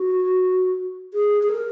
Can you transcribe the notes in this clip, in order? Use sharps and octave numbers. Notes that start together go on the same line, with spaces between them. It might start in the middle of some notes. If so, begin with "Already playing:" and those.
Already playing: F#4
G#4
G#4
A#4